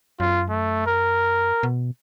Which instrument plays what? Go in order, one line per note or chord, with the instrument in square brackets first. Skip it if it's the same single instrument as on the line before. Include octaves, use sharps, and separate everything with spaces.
[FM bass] F#2 [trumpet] F4
[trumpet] A3
A#4
[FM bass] B2